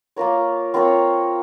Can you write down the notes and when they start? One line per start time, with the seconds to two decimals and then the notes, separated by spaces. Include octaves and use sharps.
0.16 A#3 F4 A#4 C#5
0.74 C4 F4 A#4 C#5